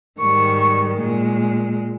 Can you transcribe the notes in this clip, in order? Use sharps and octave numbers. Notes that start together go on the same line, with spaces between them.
G#2 D#3 G3 C#6
A#2 G#3